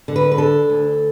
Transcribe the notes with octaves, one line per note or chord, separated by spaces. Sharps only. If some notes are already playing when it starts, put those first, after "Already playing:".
D3
B4
B4
D4 A4
D2